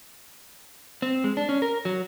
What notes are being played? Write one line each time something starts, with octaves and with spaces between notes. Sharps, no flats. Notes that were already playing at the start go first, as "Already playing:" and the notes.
C4
G#3
D4
C#4
A#4
F#3